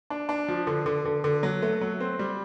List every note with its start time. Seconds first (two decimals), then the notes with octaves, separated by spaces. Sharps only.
0.10 D4
0.29 D4
0.48 F3
0.67 D3
0.86 D3
1.05 D3
1.24 D3
1.43 F#3
1.62 A3
1.81 F#3
2.00 C4
2.19 G3